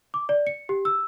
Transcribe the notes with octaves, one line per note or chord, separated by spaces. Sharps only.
D6
D5
C#7
G4
E6